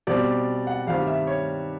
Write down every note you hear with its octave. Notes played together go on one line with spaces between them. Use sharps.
B2 G3 C4 D5
F#5
G2 D#3 G3 C4 F5
E5
C#5